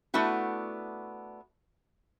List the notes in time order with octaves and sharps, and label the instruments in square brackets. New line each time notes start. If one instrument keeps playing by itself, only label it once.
[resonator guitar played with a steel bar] A3 B3 D4 E4 F#4